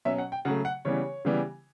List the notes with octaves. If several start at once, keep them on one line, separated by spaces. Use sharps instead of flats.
B2 F#3 C#4 E5
F#5
G5
C#3 F#3 A3 F#5
F#5
C#3 E3 G3 B3 C#5
C#3 E3 G3 B3